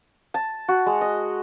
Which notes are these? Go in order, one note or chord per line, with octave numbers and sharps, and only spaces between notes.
A5
F#4
G#3
D#5